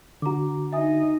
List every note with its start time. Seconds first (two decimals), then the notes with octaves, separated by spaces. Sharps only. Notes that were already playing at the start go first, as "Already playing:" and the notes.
0.22 D3 F#4 A#5 D6
0.73 D#4 D#5 E5 G#5 D#6